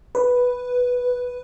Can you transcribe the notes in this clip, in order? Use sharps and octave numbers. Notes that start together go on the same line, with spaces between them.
B4